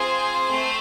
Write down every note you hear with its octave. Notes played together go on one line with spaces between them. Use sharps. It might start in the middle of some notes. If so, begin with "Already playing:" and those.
Already playing: C4 F4 G#4 C5
A3 C4